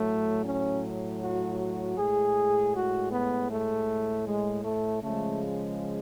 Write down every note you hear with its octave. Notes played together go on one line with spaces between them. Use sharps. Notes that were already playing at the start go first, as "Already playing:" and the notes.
Already playing: A2 F#3 A3
C#4
F#4
F#4
A2 G#3 G#4
F#4
B3
A3
G#3
A3
C#3 F3 G#3 A3